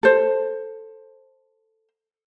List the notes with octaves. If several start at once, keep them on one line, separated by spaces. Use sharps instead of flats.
A4 C5